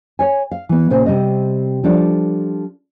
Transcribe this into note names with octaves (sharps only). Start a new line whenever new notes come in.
C#5 G#5
F5
E3 B3
A#2 C#3 C5
C3 G3 C4 D#5
F3 G3 D4 A4